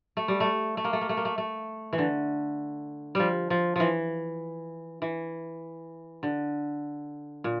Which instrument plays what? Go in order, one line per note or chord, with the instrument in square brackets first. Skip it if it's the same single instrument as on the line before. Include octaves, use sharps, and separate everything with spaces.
[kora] A3
G3
A3
A3
A#3
A3
A#3
A3
A#3
A3
A3
E3
D3
F3 G3
F3
E3 F3
E3
D3
A#2